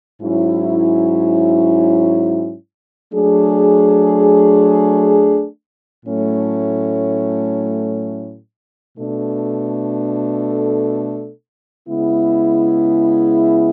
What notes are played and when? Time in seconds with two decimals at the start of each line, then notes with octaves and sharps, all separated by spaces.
0.21 G#2 F#3 C#4 E4
3.13 F#3 A3 D4 G#4
6.05 A2 F#3 A3 C#4
8.97 B2 A3 D4 A4
11.89 C#3 G#3 B3 E4